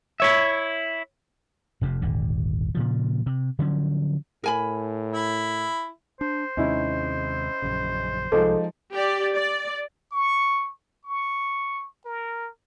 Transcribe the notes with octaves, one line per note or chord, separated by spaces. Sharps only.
E4 C#5 E5
F1 F2 C3
D#1 G#1 D3
A#2 C#3 F3
C3
D3 F3 F#3 C#4
A2 A#4 G#5 B5
E4
D4 C5
D#2 C3 G#3 C#4 D#4 E4
A#1 F#2 C#3
C2 F3 G#3 D#4 A4
G4 D5
D5
C#6
C#6
A#4